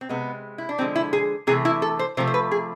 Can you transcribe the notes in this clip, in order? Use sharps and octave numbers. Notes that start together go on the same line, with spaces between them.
C4
C3 G#3 B3
E4
D4
D3 F3 G#3 C4
E4
G#4
C3 E3 A3 G#4
E4
A4
C5
C3 F3 A3 C5
C5
B4
G#4